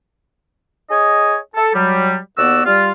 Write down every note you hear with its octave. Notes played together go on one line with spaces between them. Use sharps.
G#4 C#5 D#5
A4
F#3 G3
D#2 B3 F#4 D5 E6
G3 F4